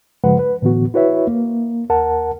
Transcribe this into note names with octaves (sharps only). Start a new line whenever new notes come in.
G2 C#3 F3 G#3 B4 F#5
B4
A2 D3 E3 B3 F#4
E4 F#4 B4 C#5 E5
A#3
D#2 A#4 F#5 A5